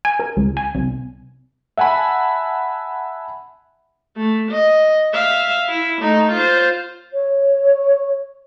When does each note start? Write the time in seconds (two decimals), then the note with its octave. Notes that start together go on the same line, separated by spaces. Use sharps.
0.05 G#5
0.19 A#4
0.37 C#2
0.57 G#5
0.75 C2
1.78 E5 F#5 G#5 A5 B5
4.17 A3
4.51 D#5
5.14 E5 F5
5.69 E4
6.02 A3 D#4
6.32 F4 C5
7.13 C#5